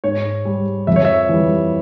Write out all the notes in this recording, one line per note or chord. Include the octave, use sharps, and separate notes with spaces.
G#2 C#5
G3
F2 E5
C#5
E5
E3 G3